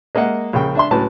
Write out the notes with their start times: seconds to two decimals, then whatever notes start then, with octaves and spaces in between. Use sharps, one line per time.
0.15 G#3 A#3 D#5 E5 F#5
0.53 A#1 C#3 G5
0.75 D4 E5 C6
0.91 C#2 A2 F#3 B4 A5